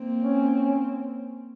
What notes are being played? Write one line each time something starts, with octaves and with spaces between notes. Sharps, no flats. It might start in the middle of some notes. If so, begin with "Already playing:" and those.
Already playing: A#3 C4
C#4
C#4